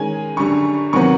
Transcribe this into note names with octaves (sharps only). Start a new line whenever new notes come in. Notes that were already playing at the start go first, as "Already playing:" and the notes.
Already playing: D#3 G#3 C#4 G#5
F#2 D3 G3 C#6
C3 D#3 F#3 B3 C#6